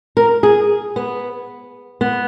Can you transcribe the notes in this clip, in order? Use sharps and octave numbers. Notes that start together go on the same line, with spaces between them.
A#4
G#4
B3
B3